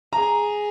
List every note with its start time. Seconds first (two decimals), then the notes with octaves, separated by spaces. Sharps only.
0.13 G#4 A#5